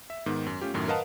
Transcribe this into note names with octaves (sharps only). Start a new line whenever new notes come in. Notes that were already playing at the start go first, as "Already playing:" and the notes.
E5
G#2 D#3 B3
F#2
A3 C#4 F4 G4
F#2 A2 D#3 F#3
A#4 B4 D#5 F5 F#5 A5